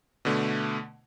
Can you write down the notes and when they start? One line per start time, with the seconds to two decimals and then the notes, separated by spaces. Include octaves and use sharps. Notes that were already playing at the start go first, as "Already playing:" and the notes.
0.25 B2 D3 A3